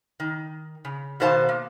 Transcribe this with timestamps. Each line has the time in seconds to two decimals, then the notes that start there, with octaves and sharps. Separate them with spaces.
0.20 D#3
0.85 C#3
1.20 B2 D#3 B3 C5 F5 A5
1.49 A#3